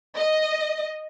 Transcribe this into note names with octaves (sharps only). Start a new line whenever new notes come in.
D#5